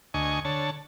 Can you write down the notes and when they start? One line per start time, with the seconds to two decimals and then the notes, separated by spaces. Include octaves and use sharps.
0.14 D2 D#5 G#5 C#6
0.45 D3 C#5 A5